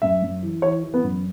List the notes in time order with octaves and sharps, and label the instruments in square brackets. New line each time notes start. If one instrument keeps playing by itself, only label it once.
[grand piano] F#2 E5
F#2
E3
E3 C#5
E3
B3
F#2